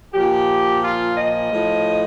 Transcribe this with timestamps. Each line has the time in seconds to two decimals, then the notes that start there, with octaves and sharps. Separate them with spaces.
0.14 A#2 F3 G4
0.82 F4
1.17 D#5
1.52 A2 F3